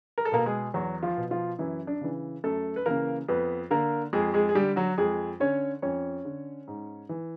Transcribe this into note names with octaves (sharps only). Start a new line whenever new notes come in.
A#4
A4
B2 A#3 A#4
G#3 G#4
E2 F#3 F#4
F3 F4
B2
F3 F4
F#2 E3 E4
D4
C#3 E3
F#2 A3 A4
B4
C#3 E3 A#3 A#4
F2 B3 B4
D3 A#3 A#4
F2 G#3 G#4
G#3 G#4
G#4
D3 G3 G4
F#3 F#4
F2 G#3 G#4
D3 C#4 C#5
F2 C#4 C#5
D3
G#2
E3